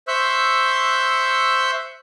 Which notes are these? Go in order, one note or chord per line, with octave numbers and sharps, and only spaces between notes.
C5 E5 C#6 E6 F#6 G6